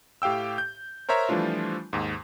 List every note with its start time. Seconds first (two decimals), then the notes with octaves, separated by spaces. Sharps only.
0.22 A2 G4 F5 G5 E6
0.58 G6
1.09 A#4 C5 C#5 E5 A#5
1.29 E3 F3 G3 A3 D4 F4
1.93 D#2 G#2